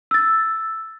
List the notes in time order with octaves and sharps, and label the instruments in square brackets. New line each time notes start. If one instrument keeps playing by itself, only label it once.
[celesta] E6 A6